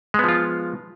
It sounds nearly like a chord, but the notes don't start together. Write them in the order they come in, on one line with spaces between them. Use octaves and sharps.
G#3 B3 F3 F4